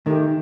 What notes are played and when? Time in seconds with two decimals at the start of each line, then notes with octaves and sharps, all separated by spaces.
0.06 D#3 A3 D#4 G4